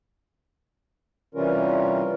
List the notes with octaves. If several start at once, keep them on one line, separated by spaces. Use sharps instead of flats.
C3 E3 G3 C#4 F4 A#4